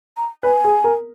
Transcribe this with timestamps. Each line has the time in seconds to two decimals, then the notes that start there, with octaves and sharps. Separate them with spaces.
0.17 A#5
0.43 B4 G#5
0.64 G#4
0.84 A#4